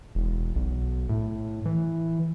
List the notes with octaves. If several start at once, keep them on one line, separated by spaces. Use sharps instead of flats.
E1
B1
A2
E3